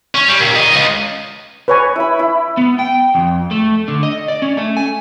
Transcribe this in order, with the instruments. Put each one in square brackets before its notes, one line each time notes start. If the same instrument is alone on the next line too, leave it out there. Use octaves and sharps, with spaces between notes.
[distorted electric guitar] C#4
G3
A#2 G3
D#3 D#5
C#2
[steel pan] B4 C#5 G#5
[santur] E4 B5
E4
[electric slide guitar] B3
G5
F2
A3
D3
D#5
D5
C#4
A3
G#5